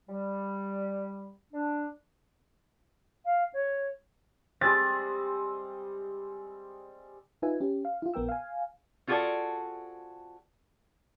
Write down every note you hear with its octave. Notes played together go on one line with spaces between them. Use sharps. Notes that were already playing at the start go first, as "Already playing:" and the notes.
G3
D4
F5
C#5
G3 G#3 C4 A6
D#4 F4 B4 E5 G#5
C#4 G4
F5
E4 F4
A#1 B3 A#4 G5 E6
F5 G#5
C4 F4 F#4 G#4 A4 D5